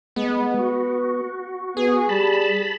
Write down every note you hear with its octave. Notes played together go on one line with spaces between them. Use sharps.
G#3 B3
F#4
B3 G#4
G3 A5 B5